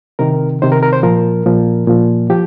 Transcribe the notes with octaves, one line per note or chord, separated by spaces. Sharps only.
C3 D#3 A#4
C3 D#3 C5
A#4
A#4
C5
A#2 F3 A#4
A#2 F3
A#2 F3
F3 G4